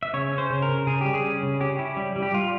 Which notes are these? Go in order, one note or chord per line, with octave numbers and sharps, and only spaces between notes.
E5
C#3 C#5
C#4
C5
C#3
A#4
C#3
C#3 G#4
G3 G4
G#4
C#4
C#3
C#4 G4
E4
G3
G3
G4
G3 F4